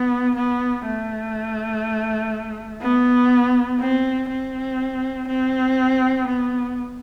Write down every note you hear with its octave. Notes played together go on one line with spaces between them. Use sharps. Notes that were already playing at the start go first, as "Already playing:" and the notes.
Already playing: B3
B3
A3
B3
C4
C4
C4
B3